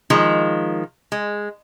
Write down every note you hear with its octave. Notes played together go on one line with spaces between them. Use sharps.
D#3 F3 G#3
G#3